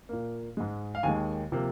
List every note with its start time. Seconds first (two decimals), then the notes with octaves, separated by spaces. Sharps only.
0.09 A#2 A#3
0.57 G#2 G#3
0.95 F5
1.03 D#2 D#3 G#3 G#5
1.52 C3 F3 A#3